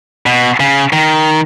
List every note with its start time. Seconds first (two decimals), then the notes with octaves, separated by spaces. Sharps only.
0.26 B2
0.60 C#3
0.93 D#3